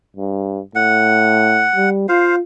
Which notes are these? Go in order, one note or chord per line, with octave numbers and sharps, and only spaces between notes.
G2
A2 F#5
G3
F4 C5 F5